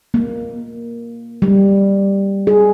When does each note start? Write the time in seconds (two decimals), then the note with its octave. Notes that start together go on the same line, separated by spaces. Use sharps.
0.14 A#3
1.42 G3
2.47 G#4